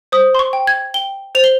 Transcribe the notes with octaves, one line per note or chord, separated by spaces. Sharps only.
C5 D#6
C6
C#6
G5
G#6
G5 G7
C5 F7
G7